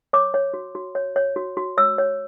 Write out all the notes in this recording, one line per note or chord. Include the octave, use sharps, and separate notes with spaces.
C#5 D6
C#5
F#4
F#4
C#5
C#5
F#4
F#4
C#5 E6
C#5